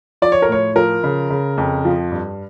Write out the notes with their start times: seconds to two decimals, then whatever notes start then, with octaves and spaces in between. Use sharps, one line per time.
0.22 F3 D5
0.32 C#5
0.42 A#4
0.48 A2 C#5
0.76 F3 A#4
1.04 C#3
1.30 C#3
1.57 F2
1.85 F3
2.12 G2